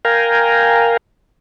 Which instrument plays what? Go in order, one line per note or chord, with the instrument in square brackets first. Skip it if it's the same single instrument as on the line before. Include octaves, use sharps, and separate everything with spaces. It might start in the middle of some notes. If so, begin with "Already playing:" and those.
[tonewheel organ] A#4 F5 G5 G#5 A#5